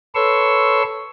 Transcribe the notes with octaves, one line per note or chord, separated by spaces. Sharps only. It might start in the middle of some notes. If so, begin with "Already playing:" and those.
A4 B4 C#5 C6 C#6 E6